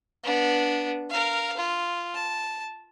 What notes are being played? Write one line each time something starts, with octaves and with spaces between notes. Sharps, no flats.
B3 D4
A#4 F5
F4
A5